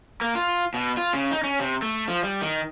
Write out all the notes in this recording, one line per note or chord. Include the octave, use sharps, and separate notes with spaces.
A#3
F4
B2
F4
C#3
D#4
C#4
C3
A3
F3
G3
D#3